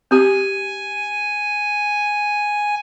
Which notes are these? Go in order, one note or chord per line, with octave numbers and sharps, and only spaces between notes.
C4 G4 G#5